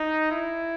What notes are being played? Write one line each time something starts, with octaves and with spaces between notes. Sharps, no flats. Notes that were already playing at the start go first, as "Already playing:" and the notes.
Already playing: D#4
E4